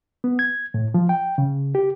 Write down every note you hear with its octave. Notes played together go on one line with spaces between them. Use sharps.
B3
G#6
A2
F3
G5
C#3
G4